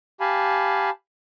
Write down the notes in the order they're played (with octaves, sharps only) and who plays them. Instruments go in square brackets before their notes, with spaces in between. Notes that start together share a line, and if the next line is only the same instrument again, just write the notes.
[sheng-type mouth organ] G4 F5 G#5 A5 B5